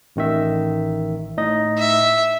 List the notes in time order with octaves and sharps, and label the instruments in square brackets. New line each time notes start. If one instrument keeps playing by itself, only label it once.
[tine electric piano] A1 D#3 E5
A2 D#4 D#5
[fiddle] E5